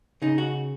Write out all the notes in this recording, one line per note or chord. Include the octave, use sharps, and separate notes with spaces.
C#3 D#4
F#4